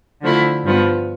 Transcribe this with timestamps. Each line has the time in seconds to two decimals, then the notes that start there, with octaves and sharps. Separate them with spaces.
0.22 D3 F3 A3 E4
0.64 G2 F3 B3